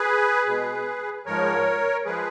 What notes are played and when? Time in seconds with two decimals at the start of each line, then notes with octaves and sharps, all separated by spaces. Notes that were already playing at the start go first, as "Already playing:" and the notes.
Already playing: G#4 B4
0.47 B2 G#3
1.26 G#2 F3 G#3 A#4 C#5
2.05 F3 G#3 G#4 B4